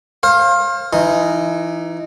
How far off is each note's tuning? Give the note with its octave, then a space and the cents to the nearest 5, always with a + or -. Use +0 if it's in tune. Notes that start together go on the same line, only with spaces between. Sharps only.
C5 +35 F5 +0
E3 +25 D#4 +0